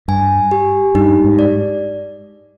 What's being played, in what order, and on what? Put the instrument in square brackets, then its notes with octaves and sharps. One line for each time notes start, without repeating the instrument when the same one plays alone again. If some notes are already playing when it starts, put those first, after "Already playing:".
[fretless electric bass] G2 [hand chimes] G#5
[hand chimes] G4
[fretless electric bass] G2 [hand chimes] D#4
[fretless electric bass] G#2
[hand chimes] D5